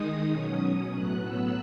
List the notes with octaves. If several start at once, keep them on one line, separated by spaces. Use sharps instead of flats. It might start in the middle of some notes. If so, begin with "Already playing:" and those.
Already playing: D#3 G#3 D#4 D#6
B2 F#3 C#4
A2 F#3 B3 F#6
E6